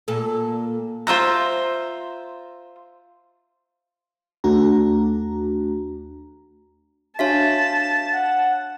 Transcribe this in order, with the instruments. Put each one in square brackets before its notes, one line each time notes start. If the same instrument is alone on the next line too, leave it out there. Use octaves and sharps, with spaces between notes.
[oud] A#2 A4
[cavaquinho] F4 C5 E5 A#5
[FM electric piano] D#2 A3 D4 F#4 A#5
[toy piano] D4 F#4 E5 [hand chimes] C#5 F5 B6 [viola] A5
[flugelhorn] F#5